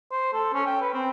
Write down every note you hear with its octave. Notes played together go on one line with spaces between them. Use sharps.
C5
A4
C#4
G5
B4
C4